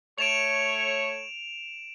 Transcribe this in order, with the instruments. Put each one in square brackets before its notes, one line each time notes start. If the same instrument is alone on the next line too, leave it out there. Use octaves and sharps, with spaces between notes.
[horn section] A3 C#5 [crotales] D7 E7 F7